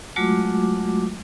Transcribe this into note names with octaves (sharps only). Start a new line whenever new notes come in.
F#3 G#3 A3 F4 F#4 D6